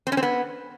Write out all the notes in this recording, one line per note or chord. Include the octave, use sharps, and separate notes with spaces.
C4
C#4
C4
B3